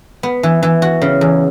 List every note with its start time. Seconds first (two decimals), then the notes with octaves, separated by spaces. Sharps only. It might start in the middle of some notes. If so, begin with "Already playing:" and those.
0.23 B3
0.43 E3
0.63 E3
0.82 F#4
1.02 C#3
1.21 E2